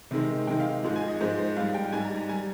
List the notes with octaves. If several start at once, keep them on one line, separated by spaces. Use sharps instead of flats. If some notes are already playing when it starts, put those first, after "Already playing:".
C3 D#3 G#3
C3 D#3 G#3 G5
F5
G#2 F3 G#3
G#5
D#5
G#2 F3 G#3 C5
C5
G#2 G3 F5
G5
G#2 G3 G#5
A#5
A#5
G3 G#5